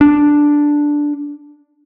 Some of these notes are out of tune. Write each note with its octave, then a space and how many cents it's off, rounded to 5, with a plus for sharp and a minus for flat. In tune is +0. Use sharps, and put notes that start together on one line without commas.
D4 +0